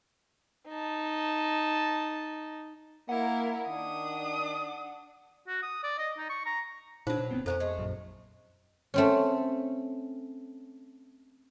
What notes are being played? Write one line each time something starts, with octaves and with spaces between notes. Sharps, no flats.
D#4 A5
A#3 E4 A#4 F#5
D#3 D4 D#6
F#4
D#6
D5
D#5
D#4
C#6
A#5
A#2 F#3 D4 D#4 G#4 B4 C5
B2
D1 B3 C4
F2 C#4 D4 A4 A#4 C5
G#3 A3
A#1 F#2
A3 C4 C#4